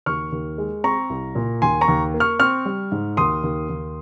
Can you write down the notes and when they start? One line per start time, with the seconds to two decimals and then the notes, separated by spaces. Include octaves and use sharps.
0.06 D#2 C#6 F6
0.32 D#2
0.58 G#3
0.84 C4 A#5 C#6
1.10 C2
1.35 A#2
1.62 D#2 G#5 C6
1.81 A#5 C#6
1.88 D#2
2.14 A#3
2.20 C#6 F6
2.39 C4 C#6 F6
2.66 G3
2.92 G#2
3.17 D#2 C6 D#6
3.43 D#2
3.69 D#2